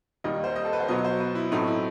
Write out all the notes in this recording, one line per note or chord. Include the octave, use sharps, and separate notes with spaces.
D#2 D#3 G3 D#5
C5
D#5
A4
B4
C5
B2 F#3 B3 D#5
C5
B4
E4
A2 F#3 A3 C4 D#4
E4